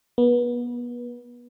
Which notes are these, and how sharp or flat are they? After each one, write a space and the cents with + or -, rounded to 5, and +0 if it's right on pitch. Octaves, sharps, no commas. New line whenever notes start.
B3 -30